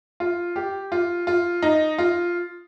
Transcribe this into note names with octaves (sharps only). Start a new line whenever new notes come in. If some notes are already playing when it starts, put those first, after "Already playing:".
F4
G4
F4
F4
D#4
F4